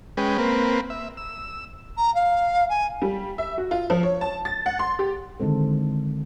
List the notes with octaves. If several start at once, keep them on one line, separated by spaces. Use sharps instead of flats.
G#3 C#4 B4 G5
A#3 C4 B4
E5
E6
A#5
F5
G#5
G3
E5
F#4
F4
F3
C#5
A5
A6
F#5
C6
G4
D3 D#3 G#3 C4 A4